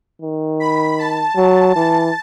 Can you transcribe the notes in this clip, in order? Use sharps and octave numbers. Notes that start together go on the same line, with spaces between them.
D#3
B5
A5
F#3
E3 A5